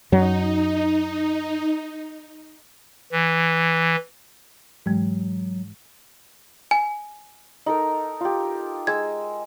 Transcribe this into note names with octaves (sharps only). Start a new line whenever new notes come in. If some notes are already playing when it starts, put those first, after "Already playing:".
F#2 F#3 D#4
E3
G#2 E3 F#3 G#3
G#5
D#4 A4 A#4
F4 G4
G#3 E6 G#6